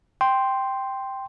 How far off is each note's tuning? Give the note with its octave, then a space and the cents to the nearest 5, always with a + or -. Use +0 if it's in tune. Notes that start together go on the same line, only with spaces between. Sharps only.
G5 +0 C6 +0